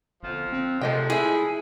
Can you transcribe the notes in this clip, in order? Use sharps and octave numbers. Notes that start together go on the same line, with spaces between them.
G1 F2 F3
C4
C3 F3 G#3 A3 D#5 G5
E4 G#4 E5